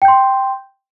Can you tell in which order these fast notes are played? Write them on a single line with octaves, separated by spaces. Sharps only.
G5 G6 C6